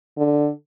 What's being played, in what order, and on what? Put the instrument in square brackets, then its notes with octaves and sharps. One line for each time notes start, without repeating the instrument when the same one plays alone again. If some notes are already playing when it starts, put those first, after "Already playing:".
[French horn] D3